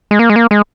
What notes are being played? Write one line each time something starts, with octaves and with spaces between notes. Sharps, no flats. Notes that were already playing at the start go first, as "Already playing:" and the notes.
G#3
A#3
G#3
A#3
G#3